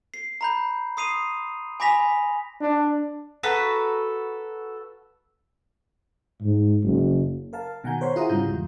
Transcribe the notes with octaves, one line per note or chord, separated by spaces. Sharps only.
C7
A#5 B5 G6
C6 D#6 C7 D#7 F7
G#5 B5 D6 A#6 B6 F7
D4
F#4 A4 B4 A#5
G#2
F#1
A#4 F5 A5
B2 D#3 F#5 G#5 A#5 G6
A#4 C5 C#5 F#5 B5 C6
E4 F4 G#4 F#5 A#5 D#6
G#2 C#3 G3 F4 A#5 G6
E2